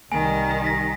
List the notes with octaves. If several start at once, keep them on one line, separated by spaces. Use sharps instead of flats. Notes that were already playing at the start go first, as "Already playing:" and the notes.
C2 D#3 G3 G#5
A#6 B6